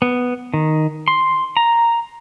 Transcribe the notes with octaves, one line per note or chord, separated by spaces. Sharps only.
B3
D#3
C6
A#5